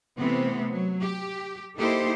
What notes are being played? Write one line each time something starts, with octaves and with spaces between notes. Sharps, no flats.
C3 E3 A3 B3 C4
F#3
G4
A#3 D#4 E4 G4 A4 C5